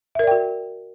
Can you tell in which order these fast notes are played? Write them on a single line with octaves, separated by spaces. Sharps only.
E5 A#4 D5 G5 F#4